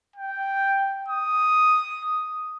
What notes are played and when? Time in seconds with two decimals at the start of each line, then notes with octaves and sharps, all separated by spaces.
0.16 G5
1.08 D#6